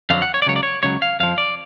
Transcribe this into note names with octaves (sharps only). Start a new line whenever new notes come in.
F2 D3 F#3 F5
F#5
C#5
D5
C#2 C#3 F#3 C#5
D5
C#5
C#2 C#3 F#3 C#5
F5
F2 F3 F5
D5